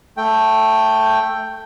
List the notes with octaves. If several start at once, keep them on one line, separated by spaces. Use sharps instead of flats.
A3 G5